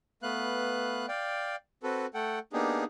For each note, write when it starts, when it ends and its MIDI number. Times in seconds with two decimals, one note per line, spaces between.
0.23 1.06 57
0.23 1.06 59
0.23 1.06 71
0.23 1.06 77
0.23 1.06 90
1.08 1.56 74
1.08 1.56 77
1.08 1.56 79
1.83 2.06 60
1.83 2.06 66
1.83 2.06 69
1.83 2.06 71
2.14 2.39 57
2.14 2.39 69
2.14 2.39 78
2.14 2.39 79
2.53 2.84 58
2.53 2.84 59
2.53 2.84 62
2.53 2.84 63
2.53 2.84 67
2.53 2.84 68